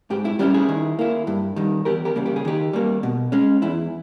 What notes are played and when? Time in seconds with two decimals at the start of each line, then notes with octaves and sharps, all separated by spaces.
0.10 G#2 G4
0.25 E4
0.39 G3 C#4 E4 G4
0.54 E4 G#4
0.69 D#3
0.99 A#3 E4
1.27 G2
1.56 D#3 G3
1.85 E2 G4 A#4
2.05 G4 A#4
2.16 C#3 G3 A#3
2.26 G4
2.36 G#4
2.45 D#3 G4
2.73 G3 A#3
3.03 B2
3.32 G#3 C#4
3.62 E2 E4